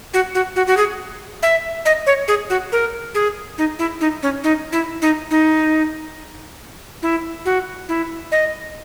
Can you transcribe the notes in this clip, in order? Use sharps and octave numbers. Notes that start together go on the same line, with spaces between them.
F#4
F#4
F#4
F#4
G#4
E5
D#5
C#5
G#4
F#4
A#4
G#4
D#4
E4
D#4
C#4
D#4
E4
D#4
D#4
E4
F#4
E4
D#5